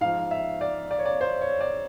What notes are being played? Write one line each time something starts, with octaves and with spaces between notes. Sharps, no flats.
G#2 F3 F5
E5
D5
D5
C#5
D5
C5
C#5
D5